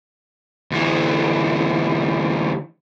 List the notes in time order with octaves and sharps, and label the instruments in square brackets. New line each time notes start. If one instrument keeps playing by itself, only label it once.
[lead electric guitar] D2 E3